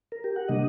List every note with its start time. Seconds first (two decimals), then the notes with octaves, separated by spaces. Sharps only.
0.12 A#4
0.24 G4
0.36 F#5
0.48 C3 G3 A#3 D4 D#5